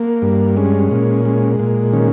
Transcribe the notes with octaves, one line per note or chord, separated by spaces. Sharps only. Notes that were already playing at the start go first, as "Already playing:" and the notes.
Already playing: A#3
G2
G#3 C#4
A#2
G#3
A#2
D#3 C#4